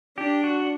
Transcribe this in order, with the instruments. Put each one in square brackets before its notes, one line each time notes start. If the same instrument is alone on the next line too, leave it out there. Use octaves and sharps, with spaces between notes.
[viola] D4 [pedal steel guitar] G4
[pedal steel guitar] F#4